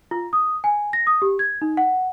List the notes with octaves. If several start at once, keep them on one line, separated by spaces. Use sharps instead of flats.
F4
D#6
G#5
A#6
D#6
G4
G#6
D#4
F#5